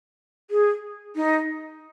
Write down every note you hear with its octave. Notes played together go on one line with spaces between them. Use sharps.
G#4
D#4